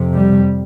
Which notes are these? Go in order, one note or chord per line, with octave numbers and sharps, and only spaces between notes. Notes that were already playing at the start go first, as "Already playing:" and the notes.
Already playing: F2 C3
G3